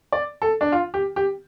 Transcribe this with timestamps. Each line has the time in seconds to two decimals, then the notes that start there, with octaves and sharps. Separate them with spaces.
0.12 D5
0.42 A4
0.61 D4
0.72 F4
0.94 G4
1.16 G4